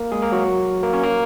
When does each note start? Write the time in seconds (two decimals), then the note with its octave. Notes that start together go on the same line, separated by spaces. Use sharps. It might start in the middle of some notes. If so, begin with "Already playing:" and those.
Already playing: A#3 A#4
0.12 G#3 G#4
0.22 A#3 A#4
0.32 F#3 F#4
0.83 A#3 A#4
0.93 C#4 C#5
1.03 A#3 A#4